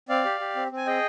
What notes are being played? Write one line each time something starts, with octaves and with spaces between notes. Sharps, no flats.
C4 D5 F5
G4
G4
C4
C4
G#5
G#4 D#5 G5